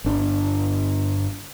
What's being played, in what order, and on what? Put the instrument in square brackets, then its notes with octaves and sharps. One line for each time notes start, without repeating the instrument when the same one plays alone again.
[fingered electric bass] G1 D4